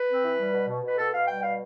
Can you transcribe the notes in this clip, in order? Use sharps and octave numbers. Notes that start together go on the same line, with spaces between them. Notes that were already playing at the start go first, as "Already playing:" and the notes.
Already playing: B4
C4
E3
G3
B2
B2
B2 B4
B2 A4
B2 F5
G3 G5
B2 F5